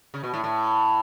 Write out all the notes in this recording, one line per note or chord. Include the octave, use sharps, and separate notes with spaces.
C#3
B2
A2
A2